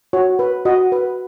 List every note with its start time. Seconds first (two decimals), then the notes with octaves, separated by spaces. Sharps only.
0.13 F#4 C#5
0.39 B4
0.65 F#4 D#5
0.92 B4